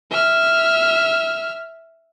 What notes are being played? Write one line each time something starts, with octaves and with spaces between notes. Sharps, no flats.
E5 F6